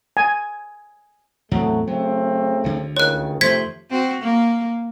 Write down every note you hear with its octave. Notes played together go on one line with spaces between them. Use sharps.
G#5
E2 A2 F#3 A3 C4
C#3 F#3 A3 C4
D2 D3
C#2 D#3 C#5 F#6
F2 C3 D#3 F3 A3 C5 G#6 B6
C4 F#4
A#3